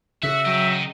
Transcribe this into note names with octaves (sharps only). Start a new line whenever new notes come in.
C#3 F#4 E5
F#3 D#5 G5